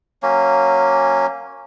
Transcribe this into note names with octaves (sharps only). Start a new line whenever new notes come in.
F#3 A#3 C#4